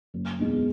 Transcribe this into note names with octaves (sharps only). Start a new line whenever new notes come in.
F#1
E2 B2 G#3 D#4